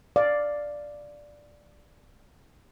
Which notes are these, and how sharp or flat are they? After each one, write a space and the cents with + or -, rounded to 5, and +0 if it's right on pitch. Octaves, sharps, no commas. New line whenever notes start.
D5 +0 F5 +0